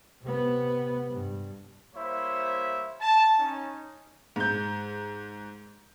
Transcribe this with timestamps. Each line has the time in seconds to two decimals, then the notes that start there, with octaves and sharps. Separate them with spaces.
0.22 C3 B3
1.10 G2
1.95 G3 A#3 E4 C5 C#5 E5
3.01 A5
3.39 C#4 D#4
4.36 G#2 G6